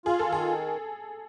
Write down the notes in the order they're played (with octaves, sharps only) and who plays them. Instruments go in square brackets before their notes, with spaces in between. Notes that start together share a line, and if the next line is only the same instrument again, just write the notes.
[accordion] F4 [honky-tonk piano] G#4
[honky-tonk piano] A4
[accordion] D#3 [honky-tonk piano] G#4